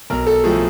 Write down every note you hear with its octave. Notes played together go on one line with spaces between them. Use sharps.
B1 A#4
A4
A2 F3 A3 G#4